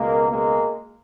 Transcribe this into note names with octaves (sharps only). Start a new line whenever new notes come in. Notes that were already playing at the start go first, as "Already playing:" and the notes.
Already playing: C#2 B2 G#3 A#3
G#3 A#3